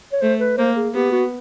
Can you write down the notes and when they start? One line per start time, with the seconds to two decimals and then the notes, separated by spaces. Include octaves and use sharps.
0.13 C#5
0.22 A3 C5
0.40 B4
0.58 A#3 C5
0.76 G#4
0.94 B3 G4
1.12 F#4